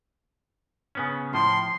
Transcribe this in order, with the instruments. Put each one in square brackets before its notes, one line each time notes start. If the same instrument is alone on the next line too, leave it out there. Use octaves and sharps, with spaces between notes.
[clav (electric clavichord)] C#3 B3 C#4
[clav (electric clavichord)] A2 F3 [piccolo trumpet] C6